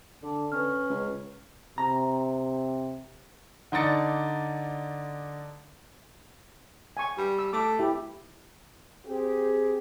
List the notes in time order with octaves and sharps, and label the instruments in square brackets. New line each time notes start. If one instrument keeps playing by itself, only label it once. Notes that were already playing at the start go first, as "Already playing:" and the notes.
[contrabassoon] D3 [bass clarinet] D4
[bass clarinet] C#4 [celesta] B4 F6
[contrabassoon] C#2
[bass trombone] C3 [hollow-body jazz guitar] A#5
[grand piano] D3 D#4 D5 A6 C#7
[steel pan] G#5 C#6
[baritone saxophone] G3
[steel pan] E6
[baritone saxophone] A3 [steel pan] D6
[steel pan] E4 G4
[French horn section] C4 G4 G#4